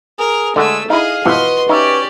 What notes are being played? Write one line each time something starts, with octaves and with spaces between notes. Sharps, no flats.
G#4 A#4
D3 G#3 A3 F#4 E6
D#4 E4 G#4 D#5 F5
B2 E3 F3 F#4 B4 D#5 C6
C#4 D#4 G4 D5 E5